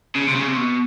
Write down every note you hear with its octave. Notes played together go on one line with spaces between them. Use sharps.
C#3
C3
C#3
C3
B2